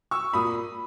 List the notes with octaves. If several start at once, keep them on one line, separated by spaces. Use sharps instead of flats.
C#6 E6
A#2 B5 D#6